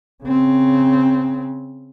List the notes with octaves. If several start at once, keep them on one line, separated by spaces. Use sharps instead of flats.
C#3 C4